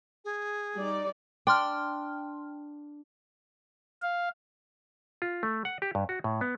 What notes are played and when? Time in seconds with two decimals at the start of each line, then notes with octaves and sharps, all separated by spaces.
0.25 G#4
0.77 G3 D#4 D5
1.47 D4 G5 C6 F6
4.02 F5
5.22 F4
5.43 A3
5.65 F#5
5.82 G4
5.95 G2
6.09 F#4
6.24 A2
6.41 B3